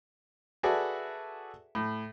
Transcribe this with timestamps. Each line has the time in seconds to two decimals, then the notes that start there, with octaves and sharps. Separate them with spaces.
0.63 F#4 G#4 A4 B4 D5 E5
1.75 A2